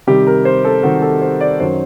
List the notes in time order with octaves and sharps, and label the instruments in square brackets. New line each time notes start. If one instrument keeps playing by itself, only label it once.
[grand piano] C3 D#3 G3 G4
A#4
C5
A4
C3 D#3 G3 F#4
A4
C5
D5
F#2 D#3 F#3 C5